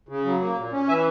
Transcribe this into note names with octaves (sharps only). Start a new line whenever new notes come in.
C#3
F#3
A#3
A#2
C#4
E3 E5 G#5